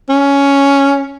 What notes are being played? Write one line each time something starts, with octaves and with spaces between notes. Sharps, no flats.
C#4